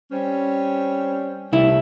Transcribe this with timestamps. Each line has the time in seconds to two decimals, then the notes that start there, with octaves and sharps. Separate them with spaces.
0.11 G3 C4 C#4
1.53 C2 A3 E4 A#4